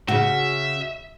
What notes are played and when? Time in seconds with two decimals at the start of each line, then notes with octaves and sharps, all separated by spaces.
0.08 C#3 F#4 E5